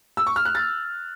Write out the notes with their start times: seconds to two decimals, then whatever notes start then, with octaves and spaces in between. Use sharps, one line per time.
0.17 E6
0.27 C#6
0.36 F6
0.45 F#6
0.55 A6